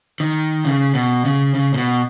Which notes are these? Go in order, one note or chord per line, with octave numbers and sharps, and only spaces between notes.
D#3
C#3
B2
C#3
C#3
A#2
B2